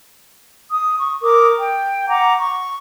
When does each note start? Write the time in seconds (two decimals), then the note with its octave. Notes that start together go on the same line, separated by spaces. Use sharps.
0.69 D#6
0.99 C#6
1.21 A#4 D6 D#6
1.58 G5
2.06 F#5 A#5 D6
2.37 C#6